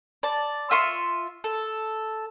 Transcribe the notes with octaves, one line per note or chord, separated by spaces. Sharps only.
D5 A5
F4 E5 C6 C#6
A4